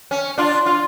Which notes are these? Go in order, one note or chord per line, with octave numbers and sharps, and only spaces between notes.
C#4
D4 F4
F4